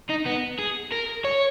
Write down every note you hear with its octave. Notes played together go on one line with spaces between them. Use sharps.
D#4
B3
G#4
A#4
C#5